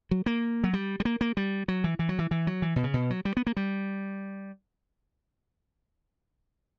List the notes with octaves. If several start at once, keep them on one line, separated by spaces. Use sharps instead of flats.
F#3
A#3
F#3
G3
G3
A#3
A#3
G3
F#3
E3
E3
F#3
E3
E3
F#3
E3
B2
C#3
B2
F#3
G3
B3
A#3
G3